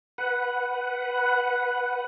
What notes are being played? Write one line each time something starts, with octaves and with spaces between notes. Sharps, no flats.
B4 F#5